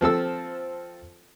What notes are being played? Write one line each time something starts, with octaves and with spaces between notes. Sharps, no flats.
F3 C4 A4 E6